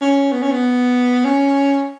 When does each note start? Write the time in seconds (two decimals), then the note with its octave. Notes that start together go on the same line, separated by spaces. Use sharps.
0.01 C#4
0.32 B3
0.42 C#4
0.52 B3
1.25 C#4